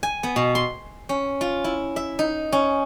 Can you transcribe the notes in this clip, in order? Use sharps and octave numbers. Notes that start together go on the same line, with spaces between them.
G#5
B3
B2
C6
C#4
F4
E4
E5
D#4
C#4